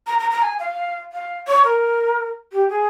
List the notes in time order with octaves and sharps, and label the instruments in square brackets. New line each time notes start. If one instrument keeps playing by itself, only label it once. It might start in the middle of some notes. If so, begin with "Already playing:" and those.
[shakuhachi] A#5
A#5
A#5
G#5
F5
F5
C#5
A#4
G4
G#4